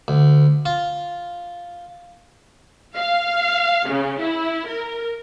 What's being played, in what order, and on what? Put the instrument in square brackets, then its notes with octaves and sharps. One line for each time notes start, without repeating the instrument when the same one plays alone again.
[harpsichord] D2
F4
[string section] F5
C#3
E4
A#4